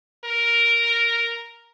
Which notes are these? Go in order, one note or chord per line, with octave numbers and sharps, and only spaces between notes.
A#4